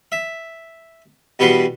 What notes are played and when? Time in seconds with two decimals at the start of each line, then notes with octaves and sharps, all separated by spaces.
0.12 E5
1.39 E2 B2 G3 B4 F#5 C6